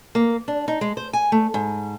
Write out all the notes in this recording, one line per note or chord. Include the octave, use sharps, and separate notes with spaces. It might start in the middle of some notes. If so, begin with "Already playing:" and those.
A#3
D4
D#4
G#3
C5
G#5
A3
G#2